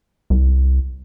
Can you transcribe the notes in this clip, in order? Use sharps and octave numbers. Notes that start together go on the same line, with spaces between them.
C2